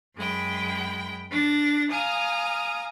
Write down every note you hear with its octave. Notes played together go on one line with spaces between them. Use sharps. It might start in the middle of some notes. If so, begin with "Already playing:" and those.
F#2 G#3 G5 B5
D4 A6 A#6
F5 G#5 A#5 D#6